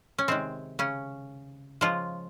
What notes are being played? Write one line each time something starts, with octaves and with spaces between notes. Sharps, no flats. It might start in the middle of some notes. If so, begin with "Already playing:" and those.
C#4
C3 D#3 G#3 C4
C#3 C#4
C#3 F3 G#3 F4